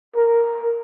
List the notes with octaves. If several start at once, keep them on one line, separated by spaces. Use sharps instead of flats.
A#4